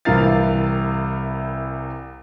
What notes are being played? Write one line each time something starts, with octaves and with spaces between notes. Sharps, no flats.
C2 C3 E3 A#4 F5 A6